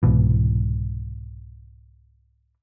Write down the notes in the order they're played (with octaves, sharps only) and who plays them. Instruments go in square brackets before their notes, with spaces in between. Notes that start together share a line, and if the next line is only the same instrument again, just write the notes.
[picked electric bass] C2 G#2 B2 E3